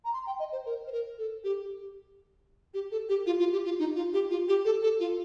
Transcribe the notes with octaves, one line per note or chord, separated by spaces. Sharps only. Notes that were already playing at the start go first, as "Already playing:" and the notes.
A#5
C6
G5
D#5
C5
A#4
C5
A#4
A4
G4
G4
A4
G4
F4
F4
G4
F4
D#4
F4
G4
F4
G4
A4
A4
F4